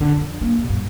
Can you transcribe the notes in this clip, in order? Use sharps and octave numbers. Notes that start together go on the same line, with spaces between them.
F1 D3
F2
A#3 D4
E2 C3
G2